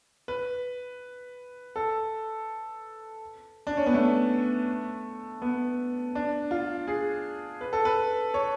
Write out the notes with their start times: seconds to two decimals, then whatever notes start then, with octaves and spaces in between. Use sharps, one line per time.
0.28 B4
1.76 A4
3.67 D4
3.77 C#4
3.86 B3
3.94 A3
5.42 B3
6.15 D4
6.51 F4
6.88 G#4
7.61 B4
7.73 A4
7.85 B4
8.34 C#5